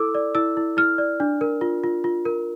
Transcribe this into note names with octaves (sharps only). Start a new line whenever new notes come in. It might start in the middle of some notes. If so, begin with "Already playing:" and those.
Already playing: E4 A4 D6 E6
D5
E4 E6
E4
E4 F6
D5
D4
A#4
F4
F4
F4
A#4